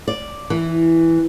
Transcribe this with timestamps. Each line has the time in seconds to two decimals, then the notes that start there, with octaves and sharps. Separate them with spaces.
0.08 D5
0.50 E3